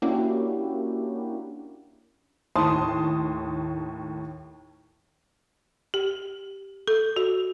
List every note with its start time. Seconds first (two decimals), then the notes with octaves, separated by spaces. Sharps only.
0.02 A#3 C#4 D4 E4 F#4 G4
2.56 D#2 A2 A5 C6 D#6
5.94 G4
6.88 A4
7.16 F#4